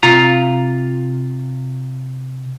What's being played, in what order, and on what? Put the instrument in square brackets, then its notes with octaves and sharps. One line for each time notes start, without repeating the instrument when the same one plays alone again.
[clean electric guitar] C3 F4 F5 A#5